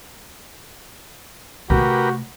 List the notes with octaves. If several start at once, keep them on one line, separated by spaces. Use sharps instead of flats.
C3 A3 F#4 G4 A#4 B4